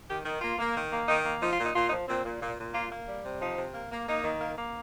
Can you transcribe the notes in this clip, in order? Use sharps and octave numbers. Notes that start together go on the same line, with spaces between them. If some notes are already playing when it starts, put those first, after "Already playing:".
D#3 G4
D#3
A#3 F4
A#3
D#3
A#3
D#3 D#4
A#3
F3 D#4
F4
A#2
D#4
A#2 F4
D#4
F3
A#2 C4
A#2
A#2
A#2
A#3 F4
A#3
G3
C3
F3 D#4
C3
A#3
A#3
A#3 D#4
D#3
A#3
A#3